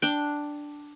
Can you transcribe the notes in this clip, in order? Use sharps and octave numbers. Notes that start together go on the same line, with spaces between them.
D4 G5